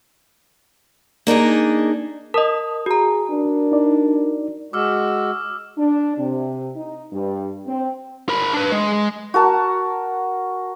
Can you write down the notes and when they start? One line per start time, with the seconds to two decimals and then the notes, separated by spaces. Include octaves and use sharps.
1.27 A#3 D4 D#4 G#4
2.34 A#4 D#5 A5 D#6
2.86 F#4 G#4 A#5
3.30 D4 A#4
3.72 D#4 D5
4.73 G#3 F#4 D6 E6 F6
5.78 D4
6.18 C3
6.76 D#4
7.13 G2
7.66 C4
8.29 A#4 B5
8.53 D4 B4
8.72 G#3
9.34 F#4 A#4 A5 A#5